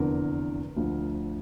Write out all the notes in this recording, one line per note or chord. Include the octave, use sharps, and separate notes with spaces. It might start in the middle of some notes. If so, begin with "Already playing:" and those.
Already playing: F1 E2 D3 A#4
D2 D3 F3